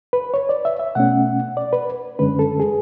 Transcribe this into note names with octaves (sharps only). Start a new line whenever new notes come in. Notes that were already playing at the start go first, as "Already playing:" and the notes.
B4
C#5
D5
E5
E5
B2 A3 C#4 F#5
D5
B4
F#2 D3 G#3 C#4 B4
A4
G#4